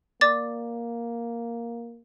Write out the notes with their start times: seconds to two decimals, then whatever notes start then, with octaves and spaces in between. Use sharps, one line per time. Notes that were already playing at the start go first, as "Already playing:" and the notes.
0.21 A#3 D5 D6 A6